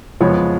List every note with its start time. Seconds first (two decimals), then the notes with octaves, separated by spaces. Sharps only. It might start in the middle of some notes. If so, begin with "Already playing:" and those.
0.20 F#1 F2 F3 G#3 B3 C#5